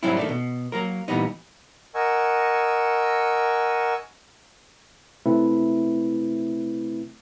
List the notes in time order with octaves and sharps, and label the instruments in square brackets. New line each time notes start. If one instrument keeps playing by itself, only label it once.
[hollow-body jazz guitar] G#2 C3 F#3 G3 C4 E4
D#3 A3 D4
B2
F#3 A#3 A#4
A#2 E3 G3 B3 D#4
[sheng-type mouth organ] A#4 D#5 F#5 G#5 C#6 E6
[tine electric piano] C3 A3 C4 E4 B4